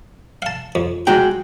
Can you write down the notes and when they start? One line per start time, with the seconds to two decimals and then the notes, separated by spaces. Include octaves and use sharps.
0.42 F5 A5
0.75 F2
1.07 G#3 F#4 G5 A#5